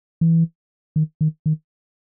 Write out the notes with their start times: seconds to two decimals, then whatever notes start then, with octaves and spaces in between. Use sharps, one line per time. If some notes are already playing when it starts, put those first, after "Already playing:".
0.21 E3
0.96 D#3
1.21 D#3
1.46 D#3